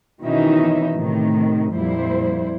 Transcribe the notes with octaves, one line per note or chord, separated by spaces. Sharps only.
B2 D#3 E3 C#4 D#4 E5
A2 C3 D#3
F2 A#2 G3 E4 C5